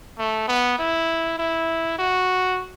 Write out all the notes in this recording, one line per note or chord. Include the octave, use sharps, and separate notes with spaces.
A3
B3
E4
E4
F#4